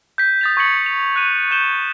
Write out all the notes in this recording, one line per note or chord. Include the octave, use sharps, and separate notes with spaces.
G6 B6
D#6 A6 F7
C#6 G#6 B6 C#7 F#7
F7
F#6 D#7
G6 E7 G7